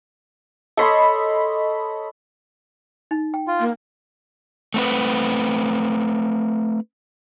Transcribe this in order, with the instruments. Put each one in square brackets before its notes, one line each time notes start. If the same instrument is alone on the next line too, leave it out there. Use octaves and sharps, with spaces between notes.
[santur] A4 C#5 C6 [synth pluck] D#5 B5
[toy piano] D#4
G5
[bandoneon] F4
[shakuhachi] A#3
[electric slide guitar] A3 C4 B4